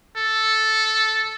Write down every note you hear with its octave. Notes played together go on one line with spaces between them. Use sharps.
A4